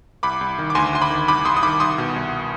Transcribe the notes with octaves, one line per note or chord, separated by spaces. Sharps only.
C2 B5 D6
C2
D#3
D6
D2 G#5 C6
D2 C6
B5 D6
D#3
C2 B5 D6
C2 C6 D#6
D#6
D#3 B5 D6
C2 C6 D#6
B2
C2